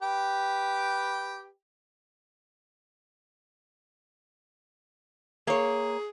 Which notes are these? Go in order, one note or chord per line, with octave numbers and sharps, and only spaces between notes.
G4 B4 G5
A#3 G#4 C#5